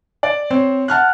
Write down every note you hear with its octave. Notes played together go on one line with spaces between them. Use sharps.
D5
C4 C5 C#5
F#5 A5 F6 F#6